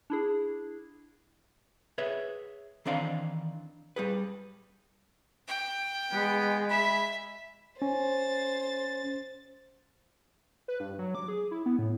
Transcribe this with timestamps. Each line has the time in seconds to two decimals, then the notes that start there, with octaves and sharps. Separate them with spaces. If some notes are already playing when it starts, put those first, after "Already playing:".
0.10 D4 E4 G#4
1.98 G#4 B4 C#5 E5
2.86 D#3 E3 C4 D4 D5 F5
3.96 G3 G#4 B4
5.48 G5
6.12 G#3 B3
6.70 E5 B5
7.82 C#4 C5 A6
10.68 B4
10.80 G2
10.99 F#3
11.15 D6
11.28 G#4
11.51 E4
11.66 B3
11.79 A2